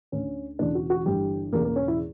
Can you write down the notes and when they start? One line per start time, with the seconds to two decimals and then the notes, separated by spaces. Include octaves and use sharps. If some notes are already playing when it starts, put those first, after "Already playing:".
0.12 D2 D3 C#4
0.59 E1 E2 C#3 E3 D4
0.75 F#4
0.90 F#4
1.06 G1 G2 E3 G4
1.53 E1 E2 C#3 A#3
1.64 A#3
1.76 C#4
1.88 E4